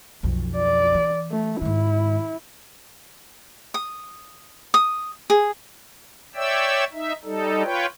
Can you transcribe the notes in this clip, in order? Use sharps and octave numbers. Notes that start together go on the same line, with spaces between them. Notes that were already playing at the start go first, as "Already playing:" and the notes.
B1 F2
D5
E3
A3
G#2 D#3 E4
D#6
D#6
G#4
C#5 D5 E5 G5 E6
D#4 E5
G3 D#4 A4
F4 B4 C#5 G5